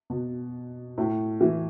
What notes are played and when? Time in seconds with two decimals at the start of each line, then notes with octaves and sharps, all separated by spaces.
0.10 B2
0.98 A2
1.41 E3